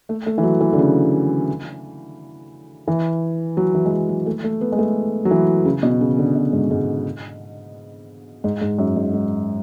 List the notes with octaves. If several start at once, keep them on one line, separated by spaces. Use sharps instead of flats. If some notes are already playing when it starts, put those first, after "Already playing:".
A3
A3
E3
F#3
E3
D3
C#3
E3
F#3
E3
G#3
F#3
F#3
A3
A3
B3
G#3
A3
F#3
E3
C#3
B2
C#3
D3
B2
G#2
G#2
G#2
G#2
F#2
G#2
G#2